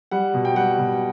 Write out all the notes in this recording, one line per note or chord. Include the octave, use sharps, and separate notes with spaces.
G3 F#5
B2
G5
G3 F#5
B2